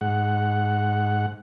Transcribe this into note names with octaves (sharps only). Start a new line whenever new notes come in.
G#2 F#5